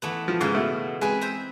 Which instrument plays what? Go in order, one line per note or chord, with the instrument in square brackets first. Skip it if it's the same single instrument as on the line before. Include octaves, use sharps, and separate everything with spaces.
[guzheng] E3 A3 B3
[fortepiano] F3
[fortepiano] G#2 [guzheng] C#3 E3 F5
[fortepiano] B2 A3
[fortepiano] G#3 G#5 [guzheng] C4 B4
[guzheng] C5 E5 A#5